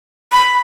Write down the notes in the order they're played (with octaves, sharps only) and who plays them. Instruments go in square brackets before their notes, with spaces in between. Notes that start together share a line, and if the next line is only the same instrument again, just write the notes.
[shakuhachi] B5